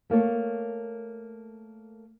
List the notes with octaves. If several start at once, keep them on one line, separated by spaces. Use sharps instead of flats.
A3 A#3 A4 C#5